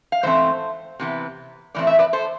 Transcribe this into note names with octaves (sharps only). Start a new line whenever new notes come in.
F5
G#2 E3 A3 C4 C5 E5
C3 E3 B3
A2 E3 A3 C4 D5
E5
B4 D5
A4 C5